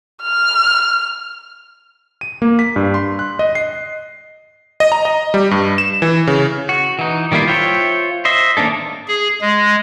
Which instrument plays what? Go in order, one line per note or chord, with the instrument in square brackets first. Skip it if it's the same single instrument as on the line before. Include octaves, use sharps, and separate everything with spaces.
[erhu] F6
[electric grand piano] D#7
A#3
B6
G2
C6
F#6
D#5
C7
D#5
A#5
D#5
G3
G2
E7
E3
C#3
[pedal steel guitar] F#4
E3 D#4
D#3 G3 A#3 E4 F4
F4 C5 C#5 E5 G5
C5 D#5 E5
D#3 A#3 C#4 D4 A4
[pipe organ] G#4
G#3